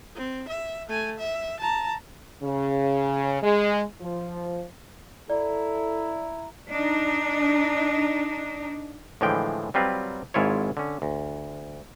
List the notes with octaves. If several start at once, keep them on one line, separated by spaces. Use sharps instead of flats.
C4
E5
A3 G#5
E5
A5 A#5
C#3
G#3
F3
E4 A4 D5 A#5
D4 D#4
A2 D3 E3 F3 G#3 G5
F#3 G3 C4 F4 B4
G#1 G#2 E4 F4 C#5
D3 C#4
D2